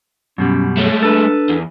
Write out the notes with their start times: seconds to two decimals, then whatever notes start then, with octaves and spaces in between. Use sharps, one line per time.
0.38 F#2 B2 G3 C#4
0.77 G#3 A3 C#5
1.03 D4 A4 B4
1.49 E2